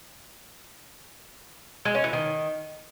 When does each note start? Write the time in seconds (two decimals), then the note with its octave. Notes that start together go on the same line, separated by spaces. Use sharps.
1.85 G#3
1.95 C#4
2.04 E3
2.13 D#3